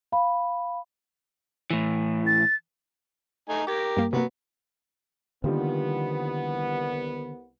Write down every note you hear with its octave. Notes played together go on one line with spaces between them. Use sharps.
F5 B5
A2 E3
A6
A3 D#4 G#5
G4 A#4 C#6 G#6
G2 A#3
C3 F#3 A#3 B3
C2 D3 D#3 F3 G3 A#3 B3